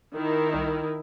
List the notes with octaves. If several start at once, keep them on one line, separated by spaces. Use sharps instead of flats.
D#3 E4
C2